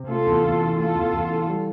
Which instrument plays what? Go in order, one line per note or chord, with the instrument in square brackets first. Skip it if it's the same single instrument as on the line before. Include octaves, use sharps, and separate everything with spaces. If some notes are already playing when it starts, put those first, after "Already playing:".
Already playing: [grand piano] C3
[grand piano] A3 [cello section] F4 A4
[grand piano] E2
E2
E3
[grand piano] A3 [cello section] F4 A4
[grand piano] E2
E2
E3
G3